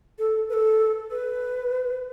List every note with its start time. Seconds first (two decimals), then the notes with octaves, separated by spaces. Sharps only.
0.19 A4
0.49 B4
0.53 A4
1.10 B4